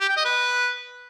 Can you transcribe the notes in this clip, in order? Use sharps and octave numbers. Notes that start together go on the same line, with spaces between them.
G4
G5
D#5
B4